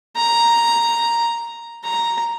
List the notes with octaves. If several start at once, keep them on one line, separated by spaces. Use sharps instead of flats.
A#5
A#5